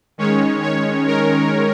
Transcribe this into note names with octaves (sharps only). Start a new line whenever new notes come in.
D#3 G#3 C#4 C#5
C#5
A#4